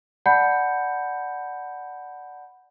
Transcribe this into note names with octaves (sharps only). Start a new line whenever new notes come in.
D5 F#5 A5 B5 G6 C#7